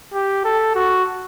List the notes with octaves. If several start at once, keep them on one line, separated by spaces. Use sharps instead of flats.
G4
A4
F#4